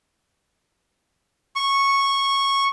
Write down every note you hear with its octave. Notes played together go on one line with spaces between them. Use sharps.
C#6